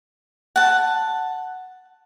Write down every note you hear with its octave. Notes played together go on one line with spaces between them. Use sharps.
F#5 A5